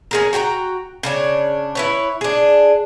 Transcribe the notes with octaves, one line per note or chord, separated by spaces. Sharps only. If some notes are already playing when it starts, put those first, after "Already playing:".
C#4 G#4 A#4
F#4 G5 G#5 A#5
C#3 D4 C#5
E4 B4 C#5
D4 G#4